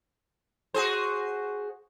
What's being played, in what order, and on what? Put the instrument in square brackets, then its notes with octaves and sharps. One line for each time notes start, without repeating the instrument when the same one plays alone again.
[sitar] F#4 G#4 C5